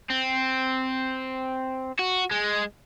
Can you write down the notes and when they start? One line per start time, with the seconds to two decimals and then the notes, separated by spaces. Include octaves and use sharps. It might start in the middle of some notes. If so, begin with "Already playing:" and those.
0.10 C4
1.99 F#4
2.31 G#3